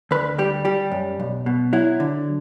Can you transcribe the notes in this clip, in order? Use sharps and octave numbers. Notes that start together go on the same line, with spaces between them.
D2 B4
G3 G4
G3 G4
F#2
B1
B2
F#3 E4
D3